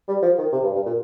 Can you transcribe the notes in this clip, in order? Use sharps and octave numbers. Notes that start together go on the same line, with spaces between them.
G3
F3
D#3
C3
G2
G2
A#2